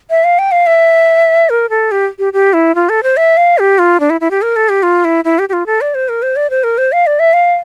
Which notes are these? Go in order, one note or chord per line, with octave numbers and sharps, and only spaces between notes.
E5
F5
G5
F5
E5
A#4
A4
G4
G4
G4
E4
F4
A4
C5
E5
F5
G4
F4
D4
E4
E4
G4
A#4
A4
G4
F4
E4
E4
G4
G4
F4
A4
D5
C5
A#4
C5
D5
C5
A#4
C5
F5
D5
E5
F5